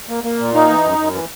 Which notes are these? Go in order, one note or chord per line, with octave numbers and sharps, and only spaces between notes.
A#3
A#3
A#2
A#3 D#4
E3
F#2
F#2
E3